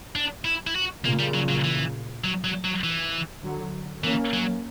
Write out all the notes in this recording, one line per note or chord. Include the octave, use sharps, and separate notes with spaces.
D4
E4
E4
F#4
A#2 C#3 A#3
G3
F#3
F#3
E3
F#3
F#3
F#3
E3
D3 F#3
E3 A#3 C#4
F#3